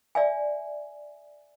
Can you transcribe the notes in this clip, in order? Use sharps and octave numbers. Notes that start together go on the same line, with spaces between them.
D5 E5 G#5